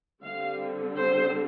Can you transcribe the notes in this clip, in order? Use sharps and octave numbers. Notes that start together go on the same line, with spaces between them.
D3 G3 C4 F5
C5